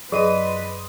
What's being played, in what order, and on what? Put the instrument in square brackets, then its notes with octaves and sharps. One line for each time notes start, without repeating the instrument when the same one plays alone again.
[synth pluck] F#2 C6 D#7 [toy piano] G#4 [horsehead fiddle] B4 [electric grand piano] D5 D#5 D#6